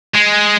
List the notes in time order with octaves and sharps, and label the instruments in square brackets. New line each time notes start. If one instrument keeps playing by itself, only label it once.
[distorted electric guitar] G#3